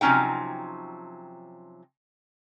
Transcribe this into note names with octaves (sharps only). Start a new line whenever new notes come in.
C3 F3 F#3 C#4 D#4 G5